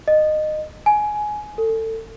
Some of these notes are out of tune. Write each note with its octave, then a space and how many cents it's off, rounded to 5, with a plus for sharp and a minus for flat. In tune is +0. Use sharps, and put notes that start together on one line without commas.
D#5 -20
G#5 +15
A4 +25